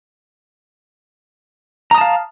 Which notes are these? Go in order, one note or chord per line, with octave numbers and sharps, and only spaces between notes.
F5 A5 A#5 D#6